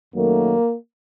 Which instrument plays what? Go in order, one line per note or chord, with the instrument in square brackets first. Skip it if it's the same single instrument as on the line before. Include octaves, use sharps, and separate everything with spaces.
[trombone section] F#2 D#3 F#3 A3 A#3